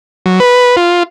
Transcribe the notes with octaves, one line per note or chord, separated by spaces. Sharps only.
F#3
B4
F4